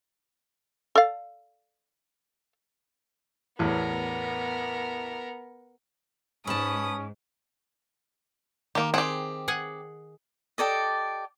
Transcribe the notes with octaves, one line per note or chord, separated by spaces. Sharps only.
A4 D5 F5
A1 E2 B3 A#4
G#2 C#4 B4 A5 D#6
D#3 A#3 G4
C4 G4 G#4 F#5
G#4 F#5 G#5
G4 A4 D5 D#5